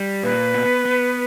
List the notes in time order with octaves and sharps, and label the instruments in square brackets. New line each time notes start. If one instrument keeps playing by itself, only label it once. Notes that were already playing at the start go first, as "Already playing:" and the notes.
Already playing: [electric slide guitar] G3
[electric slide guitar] A#2 [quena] B4
[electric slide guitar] B3
B3